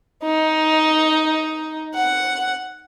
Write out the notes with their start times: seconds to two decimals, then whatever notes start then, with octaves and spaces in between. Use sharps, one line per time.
0.24 D#4
1.95 F#5